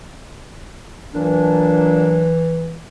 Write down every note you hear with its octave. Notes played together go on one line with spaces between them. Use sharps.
A#2 E3 F#3 D4